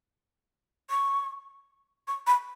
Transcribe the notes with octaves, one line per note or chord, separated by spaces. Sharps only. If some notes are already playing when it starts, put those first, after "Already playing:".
C#6
C#6
B5